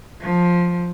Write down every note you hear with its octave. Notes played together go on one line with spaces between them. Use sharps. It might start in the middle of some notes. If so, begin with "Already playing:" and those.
F3